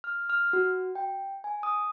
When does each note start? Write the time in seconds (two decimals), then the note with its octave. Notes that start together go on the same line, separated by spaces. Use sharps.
0.04 F6
0.30 F6
0.53 F#4
0.95 G5
1.44 G#5
1.63 D#6